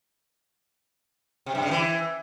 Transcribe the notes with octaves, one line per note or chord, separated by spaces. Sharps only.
C3
G2
C#3
E3